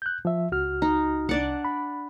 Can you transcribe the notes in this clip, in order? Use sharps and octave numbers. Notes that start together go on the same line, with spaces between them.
F#6 G6
F3 E5
C#2 F#4 F6
D#4
C2 D4 D5 F#5
B5